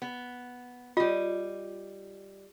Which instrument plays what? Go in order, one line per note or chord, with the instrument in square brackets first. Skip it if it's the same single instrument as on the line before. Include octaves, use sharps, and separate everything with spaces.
[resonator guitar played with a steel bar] B3
[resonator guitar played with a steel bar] G3 D#5 [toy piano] F4